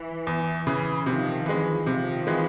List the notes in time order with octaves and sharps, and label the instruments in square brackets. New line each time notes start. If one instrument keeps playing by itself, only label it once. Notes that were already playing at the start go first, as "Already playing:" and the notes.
Already playing: [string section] E3
[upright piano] E2
C#3 E3
[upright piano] C3 [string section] D#3 F3
[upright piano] E3 G#3
[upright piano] C3 [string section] D#3 F3
[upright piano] E3 G#3